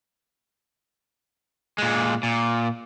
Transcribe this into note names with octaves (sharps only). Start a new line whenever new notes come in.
A#2 G#3
A#2